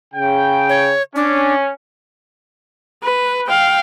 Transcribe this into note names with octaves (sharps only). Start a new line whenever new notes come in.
C#3 G5
C#5
C#4 D4
B4
F5 G5